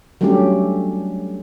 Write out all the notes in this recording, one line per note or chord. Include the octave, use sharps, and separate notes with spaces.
F#3 G3 A3 C#4 D4 G4